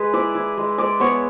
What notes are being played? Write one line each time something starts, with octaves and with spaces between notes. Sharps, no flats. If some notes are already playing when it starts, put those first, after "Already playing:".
Already playing: G#3 G#4 B4
E4 D5
E4
G#3
G#3 D5
B3 C#5